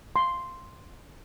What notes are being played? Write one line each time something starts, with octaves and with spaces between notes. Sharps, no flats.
C6